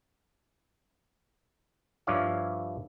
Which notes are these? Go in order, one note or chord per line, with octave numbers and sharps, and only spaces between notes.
G2 F3 E4 C#5 D5 F5